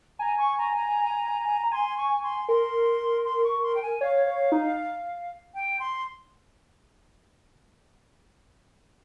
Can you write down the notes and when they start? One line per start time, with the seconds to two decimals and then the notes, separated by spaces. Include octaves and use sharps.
0.19 G#5 A#5
0.38 C#6
0.57 A#5
0.77 A#5
1.63 A#5
1.72 G#5 C6
1.97 C#6
2.23 C6
2.49 A#4 C6
3.24 C6
3.44 C#6
3.62 C6
3.75 G5
3.82 G#5
4.01 C#5 F5
4.27 C#5
4.52 D#4
5.54 G5
5.79 C6